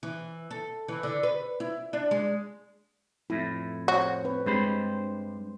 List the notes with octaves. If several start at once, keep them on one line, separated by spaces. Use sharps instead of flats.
E3
A4
E3
D3
B4
E4
D4
G#3
F2 A2 E4
F#4 C5 C#5
C4 B4
G2 G#3 C4 G4 C5 B5